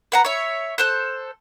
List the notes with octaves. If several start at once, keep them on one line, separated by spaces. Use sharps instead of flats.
B4 F#5 A#5
C#5 E5
A4 C5 F#6